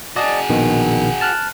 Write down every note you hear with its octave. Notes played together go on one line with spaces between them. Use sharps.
F#4 G#4 D5 D#5 A5
A#1 B2 D#3
A5 F6 F#6